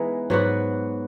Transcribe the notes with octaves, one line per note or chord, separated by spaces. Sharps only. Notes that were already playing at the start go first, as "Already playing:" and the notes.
Already playing: E3 G#3 B3 D#4
G#2 F#3 B3 F#4